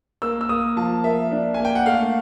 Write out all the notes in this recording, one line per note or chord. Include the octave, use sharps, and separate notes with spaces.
A#3 E6
E6
A#3 D#6
F3 A5
A#3 E5
D4
A#3 G#5
G5
F#5
A3 F5